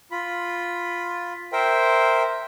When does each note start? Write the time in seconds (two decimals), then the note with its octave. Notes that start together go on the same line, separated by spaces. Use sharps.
0.11 F4 B5
1.53 A#4 C5 E5 G5